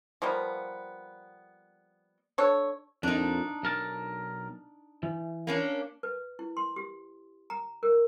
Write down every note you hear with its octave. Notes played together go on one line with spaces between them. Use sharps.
F3 G3 A#3 B3
D4 A4 C#5
F2 A#2 D4 D#4
B1 A#4 A5
E3
A#3 C#4 D4
B4
E4
C6
G4
A#5
A#4